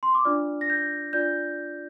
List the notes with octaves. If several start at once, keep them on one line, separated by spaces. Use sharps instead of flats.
C6
D6
D4 F4 D5 F6
A#6
G6
D4 F4 D5 G6